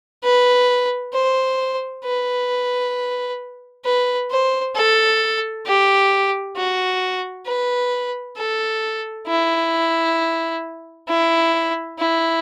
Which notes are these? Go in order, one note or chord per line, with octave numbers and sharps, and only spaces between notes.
B4
C5
B4
B4
C5
A4
G4
F#4
B4
A4
E4
E4
E4